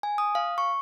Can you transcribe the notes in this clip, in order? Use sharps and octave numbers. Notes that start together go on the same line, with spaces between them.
G#5
D#6
F5
C#6